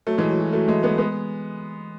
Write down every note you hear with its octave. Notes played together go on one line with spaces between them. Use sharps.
F#3 A3
E3 G#3
F#3
F#3
F#3 A3
E3 G#3
G#3 B3
G#3 B3